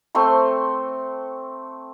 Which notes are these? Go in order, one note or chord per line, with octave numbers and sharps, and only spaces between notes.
A3 C4 C6 C#6